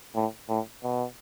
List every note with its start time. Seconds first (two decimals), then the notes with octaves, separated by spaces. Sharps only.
0.15 A2
0.49 A2
0.83 B2